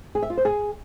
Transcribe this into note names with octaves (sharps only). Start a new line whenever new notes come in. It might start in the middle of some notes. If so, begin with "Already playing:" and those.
G#4
E5
F4
C5
G#4